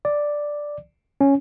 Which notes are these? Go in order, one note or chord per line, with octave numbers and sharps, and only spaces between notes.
D5
C#4